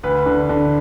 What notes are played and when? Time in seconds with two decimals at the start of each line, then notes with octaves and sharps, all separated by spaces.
0.03 D2 B4
0.26 D3
0.49 D3